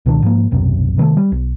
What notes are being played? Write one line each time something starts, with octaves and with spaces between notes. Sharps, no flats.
C#2 B2 D#3 D4
G#2 F3 A#3
D#1 B1 F#2 C3
C3 D#3 G3 A3
G3
B1